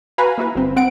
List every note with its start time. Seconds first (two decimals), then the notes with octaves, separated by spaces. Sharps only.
0.18 F#4 B4 F5 G#5 A#5 B5
0.38 A#3 E4 F#4 B4
0.55 G1 C4
0.76 C4 F#5 D7